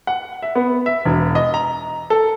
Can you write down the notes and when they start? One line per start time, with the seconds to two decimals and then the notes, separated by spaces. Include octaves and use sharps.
0.07 F#5
0.42 E5
0.55 B3
0.86 E5
1.05 E1
1.35 D#5
1.54 A#5
2.10 A4